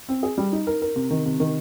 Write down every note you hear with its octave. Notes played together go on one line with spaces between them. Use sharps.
C4
G#4
G3
D#4
A#4
A#4
C3
D#3
C3
D#3